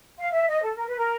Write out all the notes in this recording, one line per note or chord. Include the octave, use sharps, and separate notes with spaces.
F5
E5
D#5
A4
A#4
B4
A#4